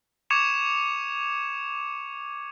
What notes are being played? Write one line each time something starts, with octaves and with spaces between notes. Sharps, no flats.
C#6 D6 G#6 C#7 E7 F7